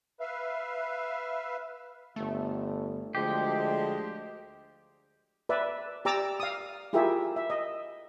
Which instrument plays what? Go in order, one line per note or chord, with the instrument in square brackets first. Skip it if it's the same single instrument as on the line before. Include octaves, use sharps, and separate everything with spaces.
[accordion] B4 E5 F5
[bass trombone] G1 [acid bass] A3
[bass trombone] D2 [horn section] F3 G3 G#3 [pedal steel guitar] G4
[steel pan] B4 D5 E5
G4 D5 A#5 D6 E6
F5 D#6
E4 F4 G4 G#4 A#4 E5
E5
D#5